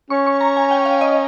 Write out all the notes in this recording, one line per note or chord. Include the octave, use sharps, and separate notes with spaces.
C#4 C#6
C#6
A#5
G#5
G5
F5
D#5